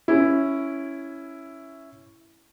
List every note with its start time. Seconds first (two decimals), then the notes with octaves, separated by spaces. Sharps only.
0.08 C#4 E4